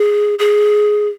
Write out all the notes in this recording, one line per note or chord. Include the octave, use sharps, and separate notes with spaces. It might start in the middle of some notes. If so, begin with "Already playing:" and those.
Already playing: G#4
G#4